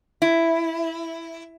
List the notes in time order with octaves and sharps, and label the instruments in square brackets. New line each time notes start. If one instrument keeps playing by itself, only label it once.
[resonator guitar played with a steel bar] E4